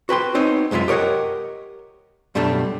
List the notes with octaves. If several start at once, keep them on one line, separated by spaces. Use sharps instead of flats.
F#4 B4 G5 C6
B3 C4 D#4 C#5
C2 F#2 G#3 F4 E5
G4 A#4 C#5 D#5 F#5
F#2 B2 G3 A3 D4